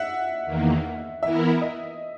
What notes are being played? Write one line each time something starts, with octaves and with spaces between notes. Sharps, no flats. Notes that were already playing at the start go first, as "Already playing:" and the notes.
Already playing: E5 F#5
E2 D#3 A#3
E3 B3 E4 A#4 E5
D#5